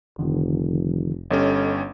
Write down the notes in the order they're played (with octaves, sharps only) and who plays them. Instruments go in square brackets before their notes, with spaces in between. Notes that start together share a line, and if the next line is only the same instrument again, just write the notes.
[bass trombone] F1 [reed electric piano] D3 D#3 F3
[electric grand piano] G1 G3 C#4 [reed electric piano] A4 C#5 D#5